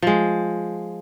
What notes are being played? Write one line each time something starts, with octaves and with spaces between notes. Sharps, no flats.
F3 G#3